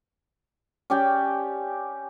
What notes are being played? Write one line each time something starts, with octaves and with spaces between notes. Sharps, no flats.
C#4 G4 D5 G5